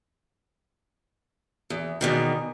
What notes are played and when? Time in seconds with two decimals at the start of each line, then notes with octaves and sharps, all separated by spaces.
1.70 E2
2.01 E2 B2 D#3